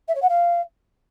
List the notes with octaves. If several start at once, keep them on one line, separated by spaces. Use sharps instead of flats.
E5
C#5
F#5
F5